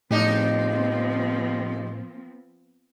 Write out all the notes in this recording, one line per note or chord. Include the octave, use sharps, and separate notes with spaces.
A2 C#3 F3 B3 C4 D#4 G4